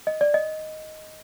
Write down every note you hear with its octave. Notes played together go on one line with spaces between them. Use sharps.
D#5
D5
D#5